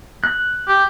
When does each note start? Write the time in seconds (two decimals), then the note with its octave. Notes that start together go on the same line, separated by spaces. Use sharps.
0.24 F#6
0.68 G4